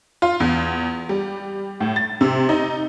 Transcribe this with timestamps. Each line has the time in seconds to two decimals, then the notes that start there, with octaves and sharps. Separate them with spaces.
0.22 F4
0.40 E2
1.09 G3
1.80 A2
1.96 A6
2.21 C3
2.49 D#4